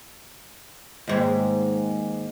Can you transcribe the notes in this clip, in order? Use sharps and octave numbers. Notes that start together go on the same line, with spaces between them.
D#2 G#2